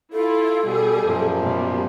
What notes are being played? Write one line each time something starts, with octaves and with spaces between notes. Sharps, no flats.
E4 F4 A4
B2 G3 G#4
F#2 A#2 F3
B2 G3